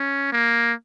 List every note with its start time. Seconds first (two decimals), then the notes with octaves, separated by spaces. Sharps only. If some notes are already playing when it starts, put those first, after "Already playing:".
Already playing: C#4
0.32 A#3